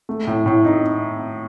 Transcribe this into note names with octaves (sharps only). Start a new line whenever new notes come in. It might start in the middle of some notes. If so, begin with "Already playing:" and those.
A3
A2
A2
D#4